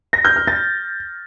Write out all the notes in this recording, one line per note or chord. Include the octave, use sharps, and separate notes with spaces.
A#6
G6
F6
A6